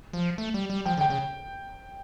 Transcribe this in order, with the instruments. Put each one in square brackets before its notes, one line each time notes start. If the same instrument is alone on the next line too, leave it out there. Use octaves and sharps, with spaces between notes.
[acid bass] F3
A3
G3
G3
[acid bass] F3 [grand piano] G5
[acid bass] D3
[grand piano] G5
[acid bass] C#3